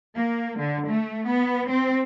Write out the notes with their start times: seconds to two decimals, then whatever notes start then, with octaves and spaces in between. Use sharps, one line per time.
0.16 A#3
0.59 D3
0.89 A3
1.28 B3
1.70 C4